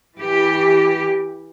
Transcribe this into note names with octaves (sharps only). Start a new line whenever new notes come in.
E3 G4